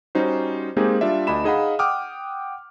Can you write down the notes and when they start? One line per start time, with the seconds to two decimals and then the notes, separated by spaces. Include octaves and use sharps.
0.15 G3 C#4 D#4 F#4 C5
0.76 G#3 A#3 C4 D#4 G4 G#4
1.01 G3 D4 F4 D5 E5
1.27 D2 D4 D#5 B5 E7
1.44 D#4 G#4 D#5 F5 F#5 B5
1.79 F#5 G5 D6 D#6 F6